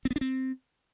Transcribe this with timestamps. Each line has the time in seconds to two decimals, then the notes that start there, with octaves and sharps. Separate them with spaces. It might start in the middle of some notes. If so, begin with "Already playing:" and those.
0.05 C4
0.11 B3
0.16 D4
0.21 C4